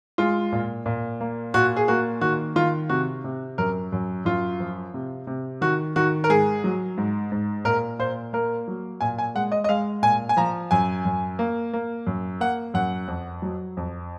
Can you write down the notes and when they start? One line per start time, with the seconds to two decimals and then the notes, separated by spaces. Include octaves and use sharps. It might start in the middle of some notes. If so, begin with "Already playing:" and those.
0.18 G#3 F4
0.52 A#2
0.86 A#2
1.21 A#3
1.54 A#2 F#4
1.76 G#4
1.88 A#3 F#4
2.21 D#3 F#4
2.56 D#3 F4
2.89 C3 F#4
3.24 C3
3.58 F#2 A#4
3.92 F#2
4.25 F#2 F4
4.60 F3
4.94 C3
5.27 C3
5.61 D#3 F#4
5.96 D#3 F#4
6.24 A#4
6.29 G#2 G#4
6.64 F#3
6.97 G#2
7.32 G#2
7.65 A#2 A#4
7.99 A#2 C5
8.33 A#3 A#4
8.68 F#3
9.01 A#2 G#5
9.18 G#5
9.35 G#3 F#5
9.52 D#5
9.64 D#5
9.69 G#3 F5
10.02 A#2 G#5
10.29 G#5
10.37 F3 A#5
10.71 F#2 G#5
11.05 F#2
11.39 A#3
11.73 A#3
12.07 F#2
12.40 A#3 F#5
12.74 F#2 F#5
13.08 F2
13.42 F#3
13.77 F2